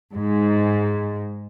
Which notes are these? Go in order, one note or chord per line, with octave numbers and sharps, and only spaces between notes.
G#2